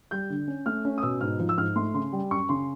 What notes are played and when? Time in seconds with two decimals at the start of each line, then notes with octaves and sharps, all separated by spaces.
0.11 G3 G6
0.30 D3
0.48 C#4
0.66 A3 F6
0.85 C#4
0.98 D#6
1.03 B2 E6
1.21 G#2 F6
1.40 F3
1.49 E6
1.58 G#2 F6
1.76 A3 C6
1.94 C#3 C6
2.12 G3
2.31 F#2 C#6
2.49 C#3 C6